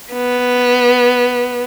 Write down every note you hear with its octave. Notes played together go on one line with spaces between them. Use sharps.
B3